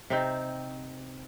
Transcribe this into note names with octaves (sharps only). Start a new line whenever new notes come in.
C3 C4 D#4